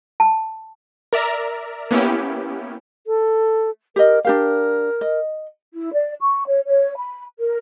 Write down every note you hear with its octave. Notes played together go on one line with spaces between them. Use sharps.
A5
A#4 D5 E5 A#5
A#3 B3 C#4 E4 G4
A4
G4 A#4 D#5
D4 G4 A#4 F5
D#5
E4
D5
C#6
C#5
C#5
B5
A#4